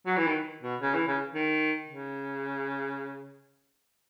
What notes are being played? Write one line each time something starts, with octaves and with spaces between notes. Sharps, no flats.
F#3
E3
D#3
B2
C#3
E3
C#3
D#3
C#3